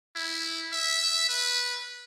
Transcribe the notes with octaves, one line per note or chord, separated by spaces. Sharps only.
E4
E5
B4